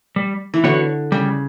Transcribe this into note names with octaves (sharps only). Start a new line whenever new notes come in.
G3
E3
D3 B3 F#4 C#5
C#3 G3